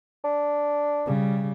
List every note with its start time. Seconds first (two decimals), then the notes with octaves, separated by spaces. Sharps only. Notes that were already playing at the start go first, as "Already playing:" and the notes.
0.24 D4
1.06 C#3 G3